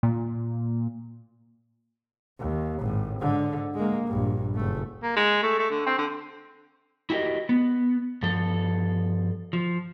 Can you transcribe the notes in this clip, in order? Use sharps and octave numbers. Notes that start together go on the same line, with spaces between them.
A#2
D#2
G#1 A2
G#2 D3
G#3 A#3
A#1 G2
F#1 A3
A#3
G#3
A3
A3
D3
C4
D3
E4 F#4 G4 A#4 D#5
B3
G2 F3 A4
F3